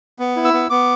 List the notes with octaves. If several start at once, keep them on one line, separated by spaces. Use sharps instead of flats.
B3
E4
E6
B3
B3 D6